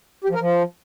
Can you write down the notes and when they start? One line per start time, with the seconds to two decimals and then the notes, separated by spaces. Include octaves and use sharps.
0.24 G4
0.30 F3
0.35 A#4
0.40 F3